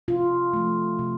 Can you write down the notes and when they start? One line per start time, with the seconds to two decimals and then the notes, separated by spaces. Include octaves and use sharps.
0.08 C3 F4
0.53 F3 A3
0.99 C3